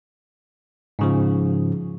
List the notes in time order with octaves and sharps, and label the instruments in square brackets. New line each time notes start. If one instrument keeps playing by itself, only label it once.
[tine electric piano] G#2 C#3 F3